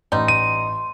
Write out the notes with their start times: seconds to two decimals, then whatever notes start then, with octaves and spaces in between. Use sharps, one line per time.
0.12 A1 G3 D#4 C6
0.28 D#7